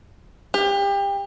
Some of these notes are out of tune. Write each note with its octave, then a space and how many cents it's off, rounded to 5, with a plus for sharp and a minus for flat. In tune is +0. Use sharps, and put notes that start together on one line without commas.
G4 +30